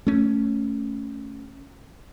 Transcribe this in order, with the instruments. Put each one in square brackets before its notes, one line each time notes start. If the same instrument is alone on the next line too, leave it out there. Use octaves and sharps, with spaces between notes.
[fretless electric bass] A3 C#4